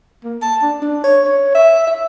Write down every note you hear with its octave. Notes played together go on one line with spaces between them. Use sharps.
A#3
A5
D4
D4
C#5
C#5
E5
E5